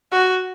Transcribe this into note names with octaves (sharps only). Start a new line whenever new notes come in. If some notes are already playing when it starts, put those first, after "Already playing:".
F#4